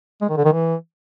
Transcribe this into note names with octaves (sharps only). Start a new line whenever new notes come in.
G#3
D#3
D3
D#3
E3